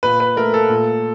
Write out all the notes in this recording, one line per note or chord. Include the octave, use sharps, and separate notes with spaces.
A#2 B4
B4
A3 A#4
A4
A#2